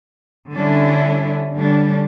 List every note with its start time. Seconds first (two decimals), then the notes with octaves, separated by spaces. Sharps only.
0.52 D3 G3 C#4 D4 E4
1.56 D3 G3 C#4 D4